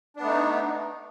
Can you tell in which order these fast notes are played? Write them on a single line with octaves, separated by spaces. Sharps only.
D4 B3 A3 D#4